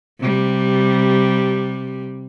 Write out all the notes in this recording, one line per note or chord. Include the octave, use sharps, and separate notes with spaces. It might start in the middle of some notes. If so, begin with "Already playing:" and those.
C3 G3